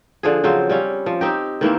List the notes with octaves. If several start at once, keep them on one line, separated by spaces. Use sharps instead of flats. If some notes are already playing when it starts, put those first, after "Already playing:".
D3 F3 G#4
C#3 F3 F#3 C4
G3 C4 C#4
F3
C4 D#4 G4
D#3 E3 A#3 C4